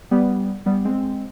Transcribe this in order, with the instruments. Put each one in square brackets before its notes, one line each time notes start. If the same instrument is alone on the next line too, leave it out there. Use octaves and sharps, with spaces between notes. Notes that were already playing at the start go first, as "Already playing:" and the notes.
[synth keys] G3 B3
G3 B3
G#3 C4